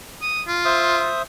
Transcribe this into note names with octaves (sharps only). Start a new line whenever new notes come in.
D#6
F4
C5 E5 D#6